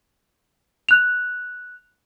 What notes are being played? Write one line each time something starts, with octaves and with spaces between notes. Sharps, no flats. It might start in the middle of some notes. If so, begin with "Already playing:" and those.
F#6 F7